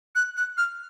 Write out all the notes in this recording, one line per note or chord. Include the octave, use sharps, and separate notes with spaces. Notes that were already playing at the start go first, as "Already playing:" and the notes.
F#6
F#6
F6